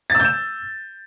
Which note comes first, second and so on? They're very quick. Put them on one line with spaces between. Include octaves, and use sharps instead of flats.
A6 E6 G6 E7